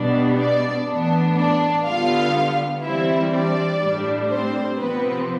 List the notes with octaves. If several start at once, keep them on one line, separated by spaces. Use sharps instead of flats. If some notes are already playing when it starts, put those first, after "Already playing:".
Already playing: B2 G3 B3 D4
D4 D5
A2 E3 B3 D4
D4 D5
D3 G3 B3 F4 F5
E3 G3 C4 E4 E5
D4 D5
A2 G3 D4
C4 C5
C3 F3 B3 C4 B4